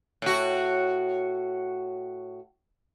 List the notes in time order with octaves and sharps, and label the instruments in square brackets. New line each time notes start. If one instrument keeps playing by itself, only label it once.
[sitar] A2 F#4